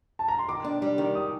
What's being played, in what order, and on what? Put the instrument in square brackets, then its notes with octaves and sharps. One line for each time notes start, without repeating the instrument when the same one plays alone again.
[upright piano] A5
A#5
C6
[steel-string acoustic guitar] D#3 [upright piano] D6
[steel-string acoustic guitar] D4
G3
D#3
[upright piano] D#6